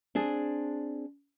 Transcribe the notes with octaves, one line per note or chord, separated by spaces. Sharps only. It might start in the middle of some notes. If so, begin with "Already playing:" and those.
C4 D4 G#4